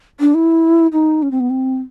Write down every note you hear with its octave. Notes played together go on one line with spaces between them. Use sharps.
D4
E4
D#4
C#4
C4
B3
C4